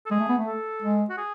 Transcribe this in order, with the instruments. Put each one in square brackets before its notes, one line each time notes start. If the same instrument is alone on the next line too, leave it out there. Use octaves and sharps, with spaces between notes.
[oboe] A4
[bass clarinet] G#3 [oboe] G#4
[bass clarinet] A3
B3
A3
[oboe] A4
[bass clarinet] G#3
[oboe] F#4
G#4